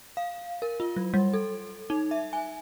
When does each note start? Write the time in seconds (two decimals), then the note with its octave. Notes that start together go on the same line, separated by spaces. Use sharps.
0.17 F5
0.62 A#4
0.80 F4
0.96 F#3
1.14 G3
1.34 A4
1.90 D#4
2.11 E5
2.33 G#5